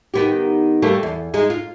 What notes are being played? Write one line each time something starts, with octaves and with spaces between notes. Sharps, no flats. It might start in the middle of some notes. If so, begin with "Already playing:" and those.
D#3 B3 G4
G3 A3 A#3
E2
G#3 D#4
F4